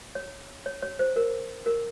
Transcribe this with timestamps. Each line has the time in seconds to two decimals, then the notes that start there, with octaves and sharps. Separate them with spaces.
0.15 C#5
0.66 C#5
0.82 C#5
0.99 C5
1.16 A#4
1.66 A#4